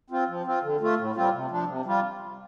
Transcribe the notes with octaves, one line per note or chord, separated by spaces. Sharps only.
C4 F4
F3
C4 F4
D3
A3 F4
A2
G3 C4 F4
C3
F3 D4
C3
G3 F4